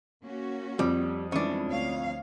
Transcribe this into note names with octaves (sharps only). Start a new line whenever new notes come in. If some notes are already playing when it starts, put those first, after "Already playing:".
A#3 C#4 F#4
F2 G3
E3 G3 G#3 C#4 D4
D2 C#5 F5